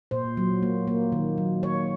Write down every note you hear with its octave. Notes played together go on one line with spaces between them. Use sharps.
A#2 C5
F#3
A#3
A#3
D#3
F#3
A#3 C#5